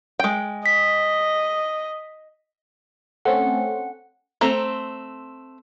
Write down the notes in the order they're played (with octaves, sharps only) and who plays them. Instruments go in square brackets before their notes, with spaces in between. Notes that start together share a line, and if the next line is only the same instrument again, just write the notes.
[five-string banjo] G#3 G5
[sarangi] D#5 [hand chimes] B6
[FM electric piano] A3 C4 C#4 [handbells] F#5
[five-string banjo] A3 C4 A#5